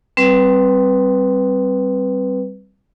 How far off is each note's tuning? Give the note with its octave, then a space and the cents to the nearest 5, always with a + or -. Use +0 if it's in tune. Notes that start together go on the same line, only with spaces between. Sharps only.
G3 -5 C4 +0 B4 +0